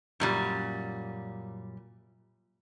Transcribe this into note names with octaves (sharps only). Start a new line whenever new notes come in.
F#2 A#2 G3